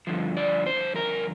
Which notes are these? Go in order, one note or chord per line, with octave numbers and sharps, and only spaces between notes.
G2 D3 F3
D5
C5
A#4